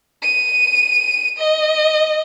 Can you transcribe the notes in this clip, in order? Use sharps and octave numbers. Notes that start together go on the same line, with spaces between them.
D#7
D#5